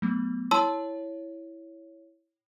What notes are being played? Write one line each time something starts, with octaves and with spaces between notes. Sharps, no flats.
F#3 A3 B3
E4 C#5 A5 C6 E6